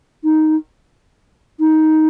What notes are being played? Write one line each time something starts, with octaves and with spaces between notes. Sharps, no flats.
D#4
D#4